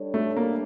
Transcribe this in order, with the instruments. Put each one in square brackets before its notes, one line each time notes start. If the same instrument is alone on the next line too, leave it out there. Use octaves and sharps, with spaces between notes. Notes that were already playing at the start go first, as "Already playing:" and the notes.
Already playing: [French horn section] G3 D4 A4 C#5
[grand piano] A3
A#3